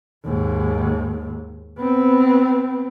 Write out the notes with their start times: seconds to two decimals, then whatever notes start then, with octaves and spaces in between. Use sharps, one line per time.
0.25 D#2 G#2
1.79 B3 C4